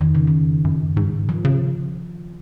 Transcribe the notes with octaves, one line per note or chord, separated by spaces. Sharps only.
F2 D#3
C#3
D#3
F#2
G#2
D#3 F3
C#3